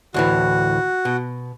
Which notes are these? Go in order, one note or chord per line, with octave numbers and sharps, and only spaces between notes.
D2 A2 E3 F#4
B2